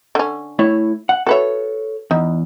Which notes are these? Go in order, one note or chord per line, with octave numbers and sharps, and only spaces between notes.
D3 C#4
A3 E4 C#5
F#5
F#4 A4 B4 C#5 E5
E2 D#4